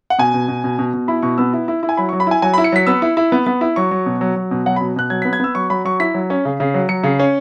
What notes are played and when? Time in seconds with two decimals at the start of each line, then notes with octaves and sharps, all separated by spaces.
0.10 F#5
0.19 B2 G#5
0.34 B2
0.48 B2
0.64 B2
0.79 B2
0.93 B2
1.08 E4 B5
1.23 B2 C#6
1.38 B3 E6
1.53 E4
1.68 E4
1.83 E4
1.89 G#5
1.97 F#3 B5
2.09 C#6
2.13 F#3
2.20 B5
2.27 E4 G#5
2.42 F#3 G#5
2.53 B5
2.58 E4
2.64 C#7
2.72 F#3 B6
2.86 B3 E6
3.02 E4
3.17 E4
3.32 B3
3.47 B3
3.61 E4
3.76 F#3 C#6
3.91 F#3
4.06 B2
4.21 F#3
4.36 F#3
4.51 B2
4.66 F#3 F#5
4.76 B5
4.81 B2
4.96 B2 F#6
5.10 F#3 G#6
5.22 B6
5.25 B3
5.33 G#6
5.40 B3 E6
5.55 F#3 C#6
5.70 F#3 B5
5.85 F#3 C#6
6.00 E4 B6
6.14 F#3
6.30 C#4
6.45 C#3
6.60 C#3
6.74 F#3
6.89 F#3 C#7
7.04 C#3
7.19 C#4